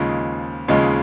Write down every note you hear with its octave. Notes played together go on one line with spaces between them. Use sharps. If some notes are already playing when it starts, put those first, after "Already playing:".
Already playing: D#2 C#3 F3 G#3 D#4
D#2 C#3 F3 G#3 D#4